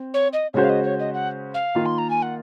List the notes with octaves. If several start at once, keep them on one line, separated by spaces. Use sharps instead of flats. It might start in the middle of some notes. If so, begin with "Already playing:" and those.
Already playing: C4
C#5
D#5
C#3 G#3 C#4 F#4 C5 C#5
F5
D#5
C#5
D#5
F#5
F5
D#3 A#3 F4
C6
A#5
G#5
F#5